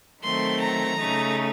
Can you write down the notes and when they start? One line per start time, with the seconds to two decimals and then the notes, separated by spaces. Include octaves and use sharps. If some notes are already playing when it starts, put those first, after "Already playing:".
0.22 D#3 F#3 A3 C4 C6
0.62 A#5
0.99 C#3 A3 D#4